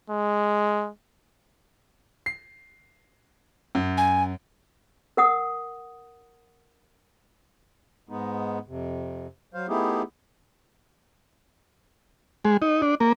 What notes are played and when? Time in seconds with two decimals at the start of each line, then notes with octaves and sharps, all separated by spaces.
0.10 G#3
2.26 C7
3.75 F#2
3.97 G#5
5.17 A#4 F#5 D#6
8.09 G#2 G#3 B3 D#4
8.67 F2 C3
9.54 F#3 C5 F5
9.68 A3 B3 D#4 E4 G4 G#4
12.45 G#3
12.62 D#4
12.82 D4
13.00 A#3